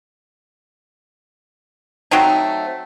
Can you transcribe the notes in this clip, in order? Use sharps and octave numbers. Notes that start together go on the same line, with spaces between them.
F#3 A3 C4 D#4